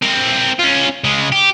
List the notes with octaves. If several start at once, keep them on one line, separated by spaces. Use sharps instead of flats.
C4 A#4
C#4 F4
C#3 G#3
G4